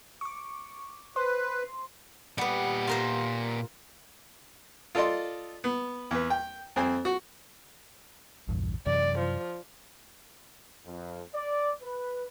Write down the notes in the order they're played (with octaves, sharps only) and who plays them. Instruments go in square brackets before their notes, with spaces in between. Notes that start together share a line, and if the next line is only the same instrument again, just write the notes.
[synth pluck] C#6 D6
[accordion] B4 [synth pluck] C5 C6
[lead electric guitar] A#2 F#5 [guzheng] G3 B3
[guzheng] F4 A#4 C5
[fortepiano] F4 A4 D5 D#5 C6
B3
E2 B4
G5
F2 C4 C5 G#5
F#4
[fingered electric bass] A#1 E2 G2
[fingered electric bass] F#2 C3 E3 [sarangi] D5
[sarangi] F3
[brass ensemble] F2
D5
B4